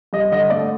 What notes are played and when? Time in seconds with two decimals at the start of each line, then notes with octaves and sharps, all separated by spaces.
0.13 G2 D#5
0.32 D3 D#5
0.50 A3 D5